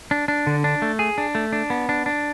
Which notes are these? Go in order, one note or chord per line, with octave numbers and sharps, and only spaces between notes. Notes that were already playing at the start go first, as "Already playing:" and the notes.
D4
D4
D3
D4
A3
G#4
D4
A3
D4
B3
D4
D4